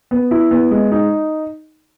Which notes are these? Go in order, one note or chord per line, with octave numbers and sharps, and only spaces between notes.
B3
E4
B3
G#3
D#4